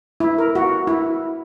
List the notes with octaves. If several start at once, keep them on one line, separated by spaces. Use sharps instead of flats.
E4
A#4
F#4
E4